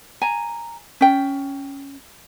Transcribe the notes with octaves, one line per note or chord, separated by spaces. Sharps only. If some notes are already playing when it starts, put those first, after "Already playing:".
G#5 A#5
C#4 G5